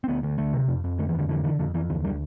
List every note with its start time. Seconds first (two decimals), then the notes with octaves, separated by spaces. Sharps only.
0.04 C4
0.08 D2 B3
0.23 D2
0.38 D2 A3
0.54 C3
0.68 F2
0.84 F2
0.99 D3 A3
1.09 E3
1.14 F2 D3
1.29 D3 E3
1.44 D3 E3
1.59 F2 D3
1.74 F2 E3
1.90 D2 E3
2.05 D3 G3